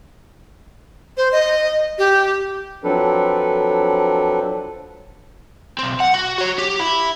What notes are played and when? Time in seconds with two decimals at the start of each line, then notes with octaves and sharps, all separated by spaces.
1.17 C5
1.32 D#5
1.98 G4
2.84 F3 F#3 C4 D4 A4 B4
5.79 B1 C4
6.00 F#5
6.14 F#4
6.38 F#4 C#5
6.58 G4
6.79 E4